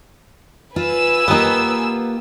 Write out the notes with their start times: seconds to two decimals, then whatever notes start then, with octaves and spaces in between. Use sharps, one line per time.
0.76 F4 B4 G#5 E6
1.28 A#3 B3 D#4 F4 G4